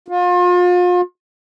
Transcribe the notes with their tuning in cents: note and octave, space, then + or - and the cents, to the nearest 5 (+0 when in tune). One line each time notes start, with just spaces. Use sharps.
F4 +35